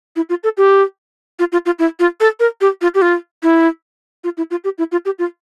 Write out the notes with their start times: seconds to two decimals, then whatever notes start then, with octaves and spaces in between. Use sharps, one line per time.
0.16 E4
0.29 F4
0.44 A4
0.57 G4
1.39 F4
1.52 F4
1.66 F4
1.79 E4
2.00 F4
2.20 A4
2.40 A#4
2.61 G4
2.82 F4
2.95 G4
3.02 F4
3.43 E4
4.24 F4
4.37 E4
4.51 F4
4.64 G4
4.78 E4
4.92 F4
5.05 G4
5.19 F4